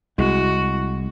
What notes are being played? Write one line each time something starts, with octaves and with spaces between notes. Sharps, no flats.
C2 G#3 E4 F#4